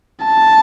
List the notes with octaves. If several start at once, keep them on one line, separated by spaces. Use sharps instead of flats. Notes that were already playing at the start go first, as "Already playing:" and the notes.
A5